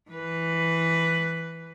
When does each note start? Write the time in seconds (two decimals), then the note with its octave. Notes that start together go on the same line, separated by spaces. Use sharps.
0.10 E3 B4